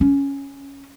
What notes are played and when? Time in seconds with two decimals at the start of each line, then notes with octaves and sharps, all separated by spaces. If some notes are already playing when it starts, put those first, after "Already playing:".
0.01 C#4